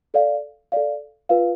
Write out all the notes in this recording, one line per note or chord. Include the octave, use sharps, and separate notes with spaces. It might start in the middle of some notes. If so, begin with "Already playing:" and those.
A4 D5 F5
A4 D5 F5
F4 B4 F5